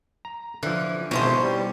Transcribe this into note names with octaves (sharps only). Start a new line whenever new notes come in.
A#5
D3 E3 F3
G#1 B2 C#4 E4 C5
G3